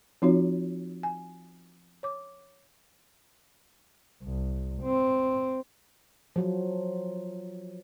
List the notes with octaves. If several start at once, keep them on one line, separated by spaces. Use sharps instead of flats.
F3 C4 D#4 F4 F#4 C#5
G#5
C#5 D6
C2
C4
F3 F#3